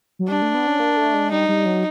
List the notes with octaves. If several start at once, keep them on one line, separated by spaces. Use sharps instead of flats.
F#3
G3 D4
A3
B3
C#4
A#3
A3
G#3
G3 D#4
G3
F#3